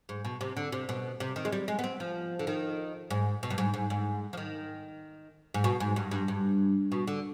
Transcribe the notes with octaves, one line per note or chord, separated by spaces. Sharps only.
G#2
B2
C3
D3
C3
B2
C3
D#3
G#3
G3
G#3
B3
C4
F3
D3
D#3
G#2
B2
G2
G#2
G#2
G#2
F3
D#3
G#2
B2
G#2
G2
G2
G2
B2
D3